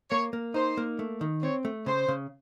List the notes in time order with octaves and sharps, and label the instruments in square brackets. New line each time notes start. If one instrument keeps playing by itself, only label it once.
[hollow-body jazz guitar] A#3 [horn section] C#5
[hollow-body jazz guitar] A#3
[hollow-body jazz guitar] D#4 [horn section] C5
[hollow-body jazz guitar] A#3
A3
D#3
[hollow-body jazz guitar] C4 [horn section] C#5
[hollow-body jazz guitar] A3
[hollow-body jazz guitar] C#3 [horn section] C5
[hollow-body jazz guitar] C#3